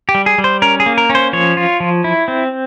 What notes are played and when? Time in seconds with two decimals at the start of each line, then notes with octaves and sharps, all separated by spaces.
0.09 G4
0.14 G3
0.26 G#4
0.38 G3
0.44 C5
0.62 C#4 A#4
0.80 G#4
0.86 A#3
0.98 A#4
1.10 C#4
1.15 C5
1.33 F3 C#5
1.57 F4
1.80 F3
2.04 E4
2.28 C4